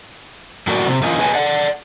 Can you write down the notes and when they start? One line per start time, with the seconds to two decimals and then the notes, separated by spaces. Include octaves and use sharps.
0.67 A2 F#3 A#3 F#4 D5
0.87 C3
1.03 E3 A#3 C#4 F4 D#5
1.19 G#4 B4 C#5 D#5 G#5 A5
1.35 D5 F#5